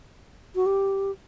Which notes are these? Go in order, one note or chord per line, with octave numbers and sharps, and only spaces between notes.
F#4
G4